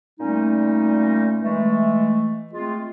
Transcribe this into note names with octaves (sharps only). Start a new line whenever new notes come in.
A#2 G3 A3 C#4 D#4
E3 G#3 A3
G#3 A3 C4 F4